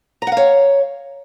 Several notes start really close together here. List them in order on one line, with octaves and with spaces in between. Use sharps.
A#5 F#5 F5 C#5